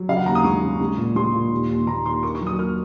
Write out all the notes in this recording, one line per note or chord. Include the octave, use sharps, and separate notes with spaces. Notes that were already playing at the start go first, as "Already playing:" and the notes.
Already playing: F#3
C#3 F5
F#5
D#2 A#5
D#6
G#3 C#6
C#3
G#3
A#2
G#3 C6
A#2
D#2
D#2
D#2 A#5
D#2 C6
A#3 C#6
C#6
F#3
D#6
A#3 F6